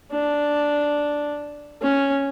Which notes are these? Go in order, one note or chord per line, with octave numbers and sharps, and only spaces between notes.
D4
C#4